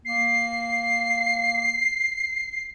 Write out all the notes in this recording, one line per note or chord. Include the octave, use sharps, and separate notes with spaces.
A#3 C7